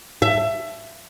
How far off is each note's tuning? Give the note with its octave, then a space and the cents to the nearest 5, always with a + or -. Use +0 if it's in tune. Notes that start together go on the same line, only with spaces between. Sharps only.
E5 +15